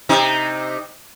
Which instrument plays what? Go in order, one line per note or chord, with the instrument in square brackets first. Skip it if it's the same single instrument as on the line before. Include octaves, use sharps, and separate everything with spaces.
[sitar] C3 D#4